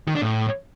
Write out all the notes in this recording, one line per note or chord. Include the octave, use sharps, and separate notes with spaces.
D#3
D4
A2